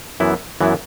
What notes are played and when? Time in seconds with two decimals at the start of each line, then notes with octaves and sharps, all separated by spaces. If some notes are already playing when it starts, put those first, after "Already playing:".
0.20 F#2 E3 B3 E4
0.61 F#2 E3 B3 E4